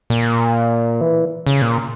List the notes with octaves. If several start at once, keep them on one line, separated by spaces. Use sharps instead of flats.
A#2
E3
C#3
A#2